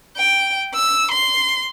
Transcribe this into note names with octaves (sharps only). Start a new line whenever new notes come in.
G5
E6
C6